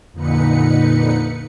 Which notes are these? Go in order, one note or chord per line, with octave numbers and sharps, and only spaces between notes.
F2 A#2 D3 D#4 B4 C#7